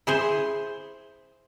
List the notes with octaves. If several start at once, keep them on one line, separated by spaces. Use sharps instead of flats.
E4 G#4 C5